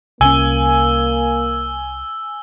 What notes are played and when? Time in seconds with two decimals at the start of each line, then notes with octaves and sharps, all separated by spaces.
0.21 C2 A#3 C#4 G#5 E6 G7